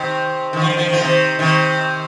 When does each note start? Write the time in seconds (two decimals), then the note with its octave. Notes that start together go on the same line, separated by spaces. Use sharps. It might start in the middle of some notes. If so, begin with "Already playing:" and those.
Already playing: C3 D#3
0.53 D#3
0.61 F3
0.70 D#3
0.77 F3
0.85 D#3
0.93 F3
1.01 C3 D#3
1.39 C3 D#3